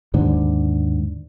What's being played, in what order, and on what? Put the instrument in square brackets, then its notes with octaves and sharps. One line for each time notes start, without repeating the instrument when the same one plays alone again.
[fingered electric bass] D#2 G#2 D3